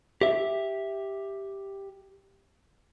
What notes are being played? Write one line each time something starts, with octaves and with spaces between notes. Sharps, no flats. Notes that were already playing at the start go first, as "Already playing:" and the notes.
G4 E5